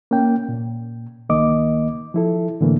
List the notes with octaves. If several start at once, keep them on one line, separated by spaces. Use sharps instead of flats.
A#3 C#4 G5
A#2
C2 D#3 A#3 D#5 D6
F3 E4 A4
A2 D3 E3 A3 A#3